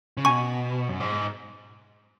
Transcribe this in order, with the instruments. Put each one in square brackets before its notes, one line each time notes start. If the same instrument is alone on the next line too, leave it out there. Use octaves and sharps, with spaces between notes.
[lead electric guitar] C#3
[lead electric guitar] B2 [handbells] G#5 C#6
[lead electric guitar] F#2
G#2